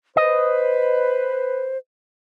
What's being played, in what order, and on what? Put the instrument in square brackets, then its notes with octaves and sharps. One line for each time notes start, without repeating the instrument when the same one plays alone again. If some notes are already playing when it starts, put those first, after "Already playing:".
[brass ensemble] B4 [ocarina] C5 [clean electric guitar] D#5